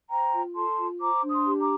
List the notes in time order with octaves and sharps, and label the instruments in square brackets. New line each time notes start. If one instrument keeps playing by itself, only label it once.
[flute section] C5 G5 A#5
F4
A4 A5 C6
F4
C5 A#5 D6
D4
C6 D#6
G4
A#5 D6